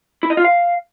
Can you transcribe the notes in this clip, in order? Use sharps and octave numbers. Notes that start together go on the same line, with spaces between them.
E4
D#5
F4
F5